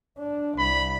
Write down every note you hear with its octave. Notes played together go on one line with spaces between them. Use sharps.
D4
C2 B5